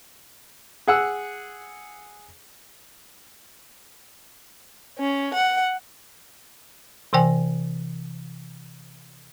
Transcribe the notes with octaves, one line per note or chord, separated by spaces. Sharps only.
G#4 F#5 E6
C#4
F#5
C3 E3 C5 G5 G#5